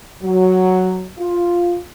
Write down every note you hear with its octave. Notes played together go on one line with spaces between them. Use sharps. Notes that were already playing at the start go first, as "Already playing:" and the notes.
F#3
F4